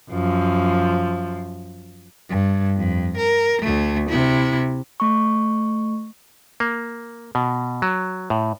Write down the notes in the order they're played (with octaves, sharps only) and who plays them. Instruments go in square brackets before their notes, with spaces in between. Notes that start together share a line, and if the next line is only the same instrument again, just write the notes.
[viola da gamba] F#2 F3
[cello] G2
F2
A#4
D2 A3
C3 E4
[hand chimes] A3 C#6
[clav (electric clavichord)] A#3
B2
F#3
A2